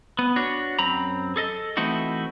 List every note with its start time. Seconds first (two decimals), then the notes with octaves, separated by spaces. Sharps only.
0.19 B3
0.36 D4 F#4 C#5
0.79 F#2 C4 A#5 B5
1.36 G#4 A4 D#5
1.77 E3 A3 C4 D#4 E4 F#4